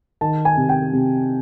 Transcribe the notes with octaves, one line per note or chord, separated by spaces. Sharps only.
D#3 A5
G#5
C3
G5
C3